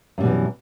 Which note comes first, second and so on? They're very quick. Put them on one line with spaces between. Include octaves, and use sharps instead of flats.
F#2 G3 B2 E3